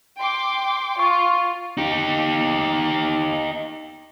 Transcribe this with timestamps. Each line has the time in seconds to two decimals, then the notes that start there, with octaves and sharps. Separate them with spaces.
0.18 G5 C6 D6
0.99 F4 C#6
1.77 D#4 G4